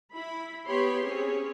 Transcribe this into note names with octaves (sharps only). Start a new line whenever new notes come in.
E4 B5
B3 G4 C#5 B5 C6
C4 C#4 G#4 C#5